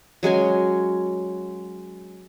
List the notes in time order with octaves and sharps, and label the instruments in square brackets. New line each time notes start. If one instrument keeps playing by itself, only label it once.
[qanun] F#3 G#3 C#4 G#5